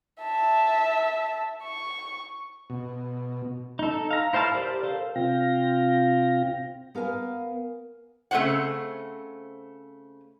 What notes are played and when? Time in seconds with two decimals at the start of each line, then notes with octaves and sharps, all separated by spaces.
0.22 E5 A5
1.64 C#6
2.70 B2
3.79 D#4 A4
4.11 F5 A#5
4.33 E4 C5 F5 A5 F6
4.54 G4 A#4 C5 D5
4.83 A4 C5 F5
5.16 C3 C4 F4 F5 G5 A#6
6.95 B3 A#4 F5 G#5
8.31 C#3 A3 C4 F#4 C5 F#5